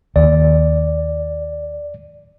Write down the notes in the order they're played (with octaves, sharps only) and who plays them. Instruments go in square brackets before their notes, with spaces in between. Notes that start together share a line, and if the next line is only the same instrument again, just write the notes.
[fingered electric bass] D#2 [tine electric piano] D5